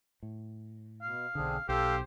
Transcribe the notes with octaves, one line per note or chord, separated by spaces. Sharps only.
A2
B2 F5
B1 D3 C4 D4 G#4
B1 G4 A4 C5 F5